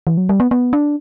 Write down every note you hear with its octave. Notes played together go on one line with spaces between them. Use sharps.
E3
F#3
G3
B3
B3
D4